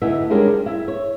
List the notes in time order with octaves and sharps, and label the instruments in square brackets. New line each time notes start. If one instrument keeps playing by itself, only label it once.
[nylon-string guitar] D2 B3 D#4 E4 E5
G3 G#3 C#4 D4 G4 A#4
G3
E4 E5
C#5